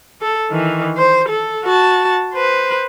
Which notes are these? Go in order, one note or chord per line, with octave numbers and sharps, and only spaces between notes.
A4
D#3 E3
C5
A4
F#4 A5
B4 C5